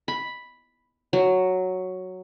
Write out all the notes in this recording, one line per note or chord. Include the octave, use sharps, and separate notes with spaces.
B5
F#3